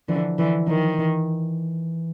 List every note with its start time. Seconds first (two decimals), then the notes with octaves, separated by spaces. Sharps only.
0.08 D3 E3 F3
0.39 D3 E3
0.68 D#3 F3
0.99 E3